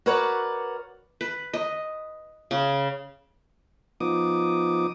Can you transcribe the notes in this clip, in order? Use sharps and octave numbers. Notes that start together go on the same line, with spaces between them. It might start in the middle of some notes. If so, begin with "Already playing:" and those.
F#4 A#4 B4 C#5 D5
B4
D#5
C#3
F3 B3 D#4 D6 D#6